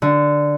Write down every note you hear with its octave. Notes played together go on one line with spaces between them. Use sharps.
D3